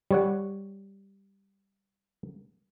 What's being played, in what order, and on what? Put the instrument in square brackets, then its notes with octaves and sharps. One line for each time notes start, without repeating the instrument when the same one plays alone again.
[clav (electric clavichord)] G3 C#5 F#5